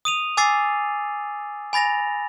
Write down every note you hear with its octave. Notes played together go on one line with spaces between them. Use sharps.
D#6 D#7 F7
G#5 D6 E6 A6 C7
G#5 B5 A6 A#6 F7